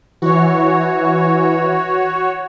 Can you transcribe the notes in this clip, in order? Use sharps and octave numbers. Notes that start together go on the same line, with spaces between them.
E3 F#4 C#5